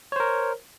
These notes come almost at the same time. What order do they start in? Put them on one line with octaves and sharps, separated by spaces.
C#5 C5 A#4